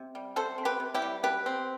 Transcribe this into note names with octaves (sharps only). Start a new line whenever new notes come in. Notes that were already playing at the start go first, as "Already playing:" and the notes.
Already playing: C3
G3
C3 A4 C5
C4
G4 B4
C3
E4 G4
G3
B2 G4 B4
C4